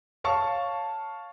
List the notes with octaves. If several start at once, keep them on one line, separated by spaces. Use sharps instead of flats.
C#5 F5 A5 C#6